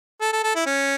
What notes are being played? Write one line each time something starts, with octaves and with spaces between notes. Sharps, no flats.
A4
A4
A4
E4
C#4